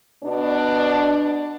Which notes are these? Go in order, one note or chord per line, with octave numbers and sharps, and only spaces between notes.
B2 B3 D4